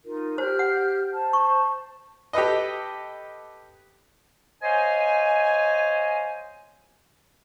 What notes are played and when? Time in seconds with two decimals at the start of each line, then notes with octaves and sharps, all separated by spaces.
0.04 D#4 F4 A#4
0.38 G4 C5 F6 G6
0.59 F#5
1.12 C5 A5
1.33 C#6
2.33 G4 A4 B4 D#5
4.62 C5 C#5 D#5 F5 G#5